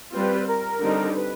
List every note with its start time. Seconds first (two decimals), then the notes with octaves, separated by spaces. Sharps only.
0.12 G3 C4 F4 B4
0.46 A#4
0.81 D3 G3 C4 D#4
1.15 B4